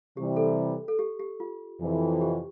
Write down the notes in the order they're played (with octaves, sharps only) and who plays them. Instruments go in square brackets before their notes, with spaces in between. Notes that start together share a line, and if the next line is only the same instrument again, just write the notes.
[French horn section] C3 E3 G3 [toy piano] G4
[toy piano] A4
A4
G4
G4
F4
[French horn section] F2 C3 E3
[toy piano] G4